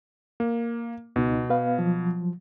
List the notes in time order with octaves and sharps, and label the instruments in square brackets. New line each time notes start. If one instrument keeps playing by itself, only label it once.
[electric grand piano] A#3
[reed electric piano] C#2 B3 D#4 [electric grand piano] B2
[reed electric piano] B3 B4 F5
F3 F#3